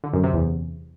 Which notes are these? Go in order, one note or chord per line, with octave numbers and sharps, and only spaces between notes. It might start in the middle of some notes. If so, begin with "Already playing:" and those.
D3
F#2
C3
E2